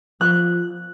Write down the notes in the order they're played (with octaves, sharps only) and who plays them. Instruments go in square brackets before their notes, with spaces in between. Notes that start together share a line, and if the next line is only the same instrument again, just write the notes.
[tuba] F3 [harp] F#6